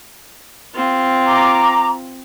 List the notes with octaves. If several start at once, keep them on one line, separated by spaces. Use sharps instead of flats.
C4 F4
A#5 D6